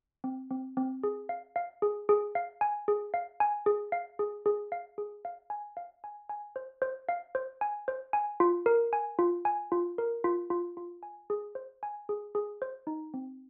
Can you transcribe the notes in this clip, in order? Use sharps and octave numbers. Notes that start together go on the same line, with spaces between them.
C4
C4
C4
G#4
F5
F5
G#4
G#4
F5
G#5
G#4
F5
G#5
G#4
F5
G#4
G#4
F5
G#4
F5
G#5
F5
G#5
G#5
C5
C5
F5
C5
G#5
C5
G#5
F4
A#4
G#5
F4
G#5
F4
A#4
F4
F4
F4
G#5
G#4
C5
G#5
G#4
G#4
C5
D#4
C4